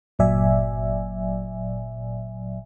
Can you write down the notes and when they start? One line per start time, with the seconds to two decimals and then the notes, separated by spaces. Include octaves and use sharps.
0.19 G1 A#2 F#3 D5 E5 G#5